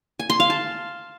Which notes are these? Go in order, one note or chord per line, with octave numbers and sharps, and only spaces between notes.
G#5
C6
F5
A5